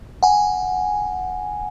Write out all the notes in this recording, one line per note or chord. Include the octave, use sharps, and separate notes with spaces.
F#5 G#5